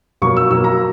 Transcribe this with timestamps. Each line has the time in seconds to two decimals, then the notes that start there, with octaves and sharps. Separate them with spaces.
0.22 B2 F#3 A#3 C#6
0.37 E6
0.50 B2 F#3 A#3 E6
0.64 A#5